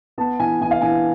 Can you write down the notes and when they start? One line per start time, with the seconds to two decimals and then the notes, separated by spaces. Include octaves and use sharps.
0.18 B3 A5
0.40 E3 G#5
0.61 E3 G#5
0.71 F5
0.81 E3 G#5